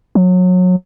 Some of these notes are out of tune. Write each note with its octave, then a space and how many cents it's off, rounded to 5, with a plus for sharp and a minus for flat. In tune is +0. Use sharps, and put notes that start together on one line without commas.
F#3 -25